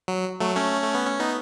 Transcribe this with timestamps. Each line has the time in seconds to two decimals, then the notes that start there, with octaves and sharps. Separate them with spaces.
0.08 F#3
0.40 F#3 A3
0.56 A3 C#4
0.82 A3
0.95 B3
1.07 C#4
1.19 B3 D#4